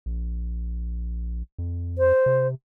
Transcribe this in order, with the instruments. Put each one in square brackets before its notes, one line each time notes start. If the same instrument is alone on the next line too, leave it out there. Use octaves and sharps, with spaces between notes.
[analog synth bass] A#1
F2
[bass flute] C5
[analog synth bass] C3